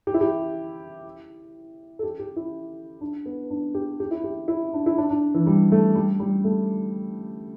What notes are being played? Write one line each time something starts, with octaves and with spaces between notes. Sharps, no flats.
G4
E4
G4
A4
G4
G4
E4
D4
B3
D4
G4
G4
E4
G4
E4
D4
E4
D4
D4
E3
G3
A3
G3
G3
A3